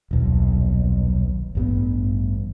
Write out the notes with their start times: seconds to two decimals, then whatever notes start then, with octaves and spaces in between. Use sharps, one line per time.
0.11 D#1 B1
1.55 A1 G2 B3